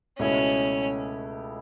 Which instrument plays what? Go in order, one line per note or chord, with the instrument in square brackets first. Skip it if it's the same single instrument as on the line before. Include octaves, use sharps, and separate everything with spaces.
[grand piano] C#2 B2 A3 E4 [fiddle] C#4